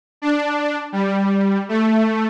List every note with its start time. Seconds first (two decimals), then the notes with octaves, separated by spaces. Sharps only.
0.22 D4
0.92 G3
1.69 A3